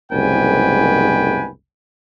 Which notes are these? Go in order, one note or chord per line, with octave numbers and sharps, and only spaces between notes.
F#1 C2 G#2 B4 G5 G#5